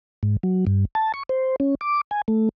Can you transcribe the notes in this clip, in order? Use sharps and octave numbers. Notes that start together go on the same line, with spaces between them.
G#2
F#3
G2
A5
C#6
C5
C#4
D6
G#5
A3